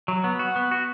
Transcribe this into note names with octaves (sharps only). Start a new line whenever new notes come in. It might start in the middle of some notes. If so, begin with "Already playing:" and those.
F#3
B3
F#4
B3
F#4